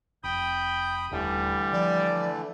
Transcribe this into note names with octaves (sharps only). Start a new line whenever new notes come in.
F1 G5 B5 D#6
D#1 D3 E3 G3 A3
F3 D5